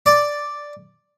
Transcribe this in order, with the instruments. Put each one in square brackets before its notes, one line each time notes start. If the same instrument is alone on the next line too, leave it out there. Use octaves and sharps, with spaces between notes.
[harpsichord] D5